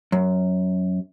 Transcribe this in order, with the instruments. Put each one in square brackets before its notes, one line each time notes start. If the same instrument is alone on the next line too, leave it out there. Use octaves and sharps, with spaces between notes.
[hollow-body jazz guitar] F#2